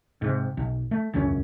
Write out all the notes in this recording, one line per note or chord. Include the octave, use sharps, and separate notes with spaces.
G#2 C3
B1
A3
E1 C#2 F#2 C#4